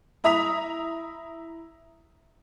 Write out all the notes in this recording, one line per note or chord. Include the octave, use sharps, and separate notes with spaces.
E4 E5 A#5 D#6 B6 F7